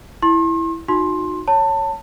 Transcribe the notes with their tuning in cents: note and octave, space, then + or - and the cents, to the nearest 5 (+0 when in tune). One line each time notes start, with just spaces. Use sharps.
E4 +0 C6 +40
D#4 +0 F#4 -30 C6 +15
C#5 +5 A5 +25